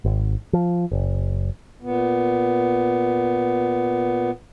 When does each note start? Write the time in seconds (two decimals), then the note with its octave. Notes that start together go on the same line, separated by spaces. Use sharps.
0.05 G#1
0.53 F3
0.92 F#1
1.82 A#2 B3